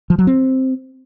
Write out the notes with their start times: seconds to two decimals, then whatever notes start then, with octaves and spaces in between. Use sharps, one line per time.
0.10 F3
0.19 F#3
0.27 C4